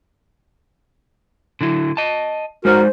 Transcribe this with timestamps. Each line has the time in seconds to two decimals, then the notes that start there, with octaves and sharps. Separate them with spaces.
1.61 D3 F#3 E4
1.97 D#5 A5
2.65 G#3 D#4 F#4 A#4 C5 D5